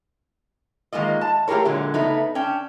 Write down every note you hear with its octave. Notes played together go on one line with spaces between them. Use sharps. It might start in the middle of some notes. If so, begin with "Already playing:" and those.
D#3 G#3 A#3 F4 D#5
A5
A3 F4 G4 G#4 A#4 C#5
A#2 D3 F#3 G#3
C#3 A3 B3 D#4
C#4 D4 G5